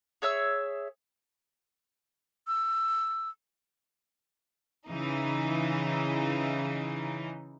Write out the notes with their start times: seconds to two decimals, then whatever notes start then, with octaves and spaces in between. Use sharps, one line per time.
0.22 G#4 C#5 E5 E6
2.47 E6
4.88 C#3 E3 D#4